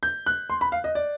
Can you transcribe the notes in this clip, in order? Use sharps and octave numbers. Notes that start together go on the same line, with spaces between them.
G6
F#6
C6
B5
F5
D#5
D5